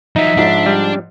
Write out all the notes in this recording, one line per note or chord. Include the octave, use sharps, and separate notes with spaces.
F3 F#3 D#4 E5
G#2 F3 D4
G3